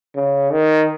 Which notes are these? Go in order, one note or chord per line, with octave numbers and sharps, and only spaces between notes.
C#3
D#3